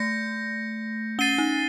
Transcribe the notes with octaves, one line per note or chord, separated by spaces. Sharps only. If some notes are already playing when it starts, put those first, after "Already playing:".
Already playing: A3 G6 A#6 C#7
C#4 A6 C7 D#7 G7
D#4